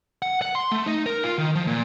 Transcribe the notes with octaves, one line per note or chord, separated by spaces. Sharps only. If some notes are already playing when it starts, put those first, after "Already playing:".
F#5
F#5
C6
A3
D#4
A#4
F4
D#3
F3
A#2